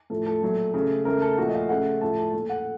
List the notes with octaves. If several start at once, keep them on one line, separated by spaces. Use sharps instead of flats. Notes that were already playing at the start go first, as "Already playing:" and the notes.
A2 F3 A3 A4
A4
A#2 F#3 A3
C#3 A3
C#3 A3 A#4
A4
A#2 F3 A3 F#4
D#5
F5
C#3 A3 F#5
A2 F3 A3 A5
A5
A#2 A3
F#5